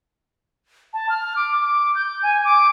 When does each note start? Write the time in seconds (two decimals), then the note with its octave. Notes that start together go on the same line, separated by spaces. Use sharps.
0.94 A5
1.10 F6
1.36 D6
1.62 D6
1.95 G6
2.23 G#5
2.45 D6